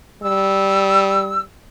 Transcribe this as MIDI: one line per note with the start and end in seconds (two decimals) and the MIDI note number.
0.23 1.47 55
0.23 1.39 88